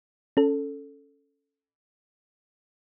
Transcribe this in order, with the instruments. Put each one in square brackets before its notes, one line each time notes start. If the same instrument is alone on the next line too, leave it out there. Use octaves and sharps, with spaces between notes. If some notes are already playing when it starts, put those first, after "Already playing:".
[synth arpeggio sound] C#4 A4